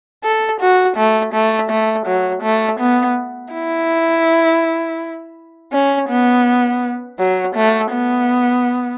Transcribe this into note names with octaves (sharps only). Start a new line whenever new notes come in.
A4
F#4
A3
A3
A3
F#3
A3
B3
E4
C#4
B3
F#3
A3
B3